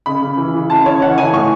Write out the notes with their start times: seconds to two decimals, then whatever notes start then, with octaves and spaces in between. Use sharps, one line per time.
0.06 C#3 B5
0.22 C#3
0.37 E3
0.54 E3
0.70 C#3 A5
0.86 C#3 C#5
1.01 E3 F#5
1.18 E3 G#5
1.33 A2 C#6